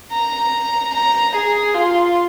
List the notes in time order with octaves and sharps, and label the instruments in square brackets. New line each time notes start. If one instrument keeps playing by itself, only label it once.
[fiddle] A#5
A#5
G#4
F4